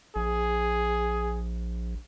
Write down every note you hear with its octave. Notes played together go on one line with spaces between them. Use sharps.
A#1 G#4